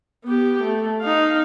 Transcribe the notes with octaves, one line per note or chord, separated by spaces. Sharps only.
B3 G4
A3
D#4 F5